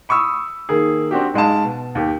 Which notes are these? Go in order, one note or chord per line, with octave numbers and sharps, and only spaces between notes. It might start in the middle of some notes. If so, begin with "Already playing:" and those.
B5 C#6 D#6 E6
D#3 A#3 G#4
C4 D4 F#4 G4
G#2 G#3 F5 A5
B2
D#2 G4